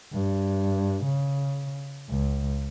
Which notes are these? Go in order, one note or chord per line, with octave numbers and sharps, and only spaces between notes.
G2
C#3
C#2